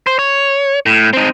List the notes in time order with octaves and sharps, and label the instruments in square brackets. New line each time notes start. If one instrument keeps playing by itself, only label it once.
[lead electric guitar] C5
C#5
A2
C4 D#4